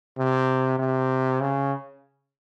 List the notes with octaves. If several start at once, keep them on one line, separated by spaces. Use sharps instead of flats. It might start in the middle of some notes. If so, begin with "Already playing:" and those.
C3
C3
C#3